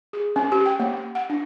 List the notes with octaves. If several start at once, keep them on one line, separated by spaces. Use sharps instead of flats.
G#4
C#4
G4
G5
A#3
F#5
D4